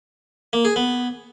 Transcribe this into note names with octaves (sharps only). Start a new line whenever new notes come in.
A#3
G#4
B3